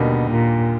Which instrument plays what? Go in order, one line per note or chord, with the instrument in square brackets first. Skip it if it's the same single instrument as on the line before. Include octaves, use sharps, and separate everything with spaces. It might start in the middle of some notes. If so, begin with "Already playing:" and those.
Already playing: [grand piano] D#2 D3 G3 A#3 D#4 [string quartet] B2
[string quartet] A#2